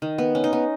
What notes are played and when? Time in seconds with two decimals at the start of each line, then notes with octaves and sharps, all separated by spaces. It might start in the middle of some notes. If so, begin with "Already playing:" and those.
0.02 D#3
0.18 B3
0.35 C#4
0.44 D#4
0.53 B3